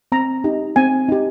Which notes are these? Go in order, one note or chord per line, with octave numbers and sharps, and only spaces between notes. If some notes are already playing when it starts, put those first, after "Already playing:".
C4 A#5
D#4 G4
C4 G#5
D#4 G4